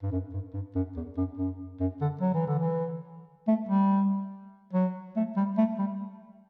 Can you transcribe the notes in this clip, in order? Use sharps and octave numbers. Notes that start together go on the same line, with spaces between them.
G2
F#2
G2
G2
F#2
E2
F#2
F#2
F#2
D3
F#3
E3
D3
E3
A3
G3
F#3
A3
G3
A3
G3